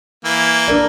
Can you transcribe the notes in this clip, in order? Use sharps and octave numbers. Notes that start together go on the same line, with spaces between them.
E3 A#3
D4 A#4 D5